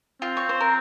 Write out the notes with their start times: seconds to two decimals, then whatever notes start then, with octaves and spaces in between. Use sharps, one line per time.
0.22 C4 F4
0.37 C#5
0.49 C5
0.60 A#4